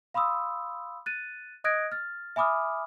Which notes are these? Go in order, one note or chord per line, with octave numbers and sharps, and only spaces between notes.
F5 B5 C6 D#6 E6
F#6 A6 D#7
D#5 D#6 F#6 G#6 A#6 D7
F6 A6
E5 G#5 B5 D6 D#6 F6